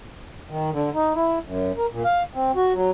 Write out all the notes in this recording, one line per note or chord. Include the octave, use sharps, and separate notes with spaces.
D#3
D3
D#4
E4
F#2
A#4
A#2
F5
C4
F#4
F#3